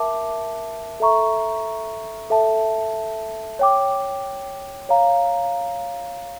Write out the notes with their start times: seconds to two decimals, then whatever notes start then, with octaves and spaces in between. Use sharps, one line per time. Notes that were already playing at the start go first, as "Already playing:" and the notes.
Already playing: A#4 E5 A5 D6
1.00 A4 E5 A#5 C#6
2.30 A4 E5 A5
3.59 C#5 G5 D6
4.89 C#5 F5 A#5